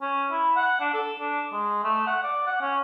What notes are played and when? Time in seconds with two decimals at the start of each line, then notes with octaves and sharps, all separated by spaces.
0.02 C#4
0.31 E4
0.56 F#5
0.81 D4
0.94 A4
1.19 D4
1.52 G#3
1.84 A3
2.07 F#5
2.23 D5
2.46 F#5
2.62 C#4